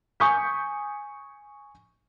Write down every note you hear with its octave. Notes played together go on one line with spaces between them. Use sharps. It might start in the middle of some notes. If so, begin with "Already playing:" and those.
G#5 C#6 D#6 G6 B6